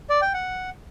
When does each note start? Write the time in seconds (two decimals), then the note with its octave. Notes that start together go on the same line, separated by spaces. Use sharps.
0.10 D5
0.22 G5
0.34 F#5